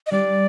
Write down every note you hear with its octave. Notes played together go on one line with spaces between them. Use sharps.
D#5
G3 D4 G4 D5